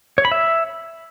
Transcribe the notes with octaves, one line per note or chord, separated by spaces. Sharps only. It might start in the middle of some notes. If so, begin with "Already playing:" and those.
C#5
B5
E5